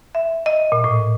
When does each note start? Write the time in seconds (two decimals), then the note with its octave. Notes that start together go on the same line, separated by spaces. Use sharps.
0.15 E5
0.46 D#5
0.72 A#2
0.84 A2